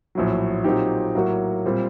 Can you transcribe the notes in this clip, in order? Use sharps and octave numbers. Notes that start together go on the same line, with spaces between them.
A#1 A2 F#3
A#2 F#3 C4 D#4 G4
A2 F#3 A#3 F#4
A#2 G3 C4